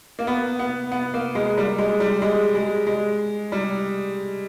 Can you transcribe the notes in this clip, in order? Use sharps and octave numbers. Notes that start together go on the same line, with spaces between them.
A#3
B3
B3
B3
A#3
G#3
G3
G#3
G3
G#3
G#3
G#3
G3